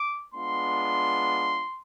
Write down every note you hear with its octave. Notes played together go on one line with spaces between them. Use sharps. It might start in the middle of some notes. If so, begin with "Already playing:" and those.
Already playing: D6
G#3 B3 D4 F4 C6